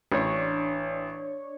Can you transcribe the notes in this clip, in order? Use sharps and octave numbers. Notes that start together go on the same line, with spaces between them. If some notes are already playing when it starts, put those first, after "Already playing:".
A1 D4 C#5